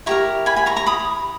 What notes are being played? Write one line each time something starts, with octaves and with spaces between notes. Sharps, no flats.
E4 G4 A#4 A#5 C#6
G#5 B5
G#5 B5
A#5 C#6
A#5 C#6
B5 D#6